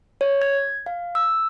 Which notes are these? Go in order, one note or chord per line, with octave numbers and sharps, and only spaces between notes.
C#5
G#6
F5
E6